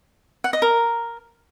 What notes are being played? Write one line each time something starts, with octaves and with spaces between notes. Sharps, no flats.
F#5
D#5
A#4